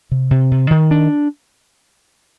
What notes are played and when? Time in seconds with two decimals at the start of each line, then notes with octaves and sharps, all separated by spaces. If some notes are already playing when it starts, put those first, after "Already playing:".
0.11 C3
0.31 C3
0.52 C3
0.71 D#3
0.91 D4